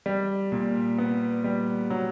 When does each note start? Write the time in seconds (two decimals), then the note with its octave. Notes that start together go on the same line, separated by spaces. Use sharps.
0.06 G3
0.52 A#2
0.98 B3
1.44 G3
1.90 F#3